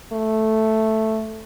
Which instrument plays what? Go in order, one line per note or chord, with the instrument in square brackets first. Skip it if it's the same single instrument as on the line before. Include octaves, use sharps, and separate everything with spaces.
[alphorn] A3